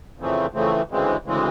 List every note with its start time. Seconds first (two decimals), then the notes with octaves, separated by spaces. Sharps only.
0.18 F2 C#3 E3 A3 C4
0.53 F2 C#3 E3 A3 C4
0.90 D2 C#3 E3 G#3 C4
1.24 D2 C#3 E3 G#3 C4